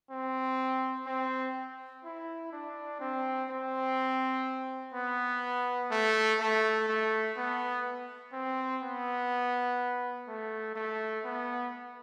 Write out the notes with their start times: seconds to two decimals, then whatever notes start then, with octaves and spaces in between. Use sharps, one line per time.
0.11 C4
1.06 C4
2.04 E4
2.52 D4
3.00 C4
3.49 C4
4.94 B3
5.91 A3
6.40 A3
6.88 A3
7.37 B3
8.33 C4
8.82 B3
10.28 A3
10.76 A3
11.24 B3